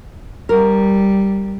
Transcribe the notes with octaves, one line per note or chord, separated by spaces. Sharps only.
G3 A#4